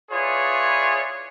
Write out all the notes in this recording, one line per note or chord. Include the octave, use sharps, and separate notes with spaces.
E4 F4 G#4 B4 C#5 D5